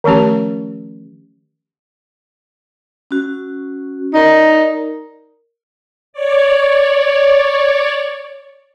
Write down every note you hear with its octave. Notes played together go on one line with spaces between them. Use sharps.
D#3 F3 A3 C#4 G4
C#4 F#4
D#4 A#4 D5
C#5 D5